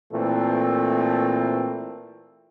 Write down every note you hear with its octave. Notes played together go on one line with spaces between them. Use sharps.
A#2 E3 A3 C4